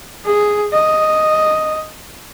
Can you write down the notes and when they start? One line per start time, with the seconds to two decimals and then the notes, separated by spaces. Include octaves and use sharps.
0.26 G#4
0.73 D#5